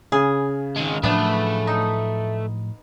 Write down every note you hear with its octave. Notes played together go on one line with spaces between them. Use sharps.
C#3 G#4
D#3 G#3
A2 F3 F#3 A3 B3 D4
D#4